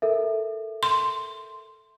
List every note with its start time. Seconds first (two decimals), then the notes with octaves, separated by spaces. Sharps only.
0.02 A4 A#4 E5
0.83 C6